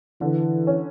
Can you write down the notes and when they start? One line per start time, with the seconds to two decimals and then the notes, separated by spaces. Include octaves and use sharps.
0.21 D3 E3
0.67 C#4